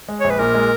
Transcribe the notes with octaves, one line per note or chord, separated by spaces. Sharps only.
G#3
A#1 C#5
B4
A#2 A#4
G#3